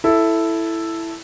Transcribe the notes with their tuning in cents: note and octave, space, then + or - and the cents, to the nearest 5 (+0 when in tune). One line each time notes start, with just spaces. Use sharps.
E4 +5 A4 +0